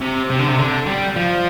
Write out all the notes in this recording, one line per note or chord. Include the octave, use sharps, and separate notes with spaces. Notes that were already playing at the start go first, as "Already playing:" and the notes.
C3
C3
D3
C3
D3
G3
F3